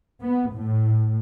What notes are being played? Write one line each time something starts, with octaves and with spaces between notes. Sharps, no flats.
B3
A2